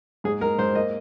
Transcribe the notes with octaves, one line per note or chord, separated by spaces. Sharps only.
G#2 G#4
G#3 A#4
G#2 C5
A#3 D#5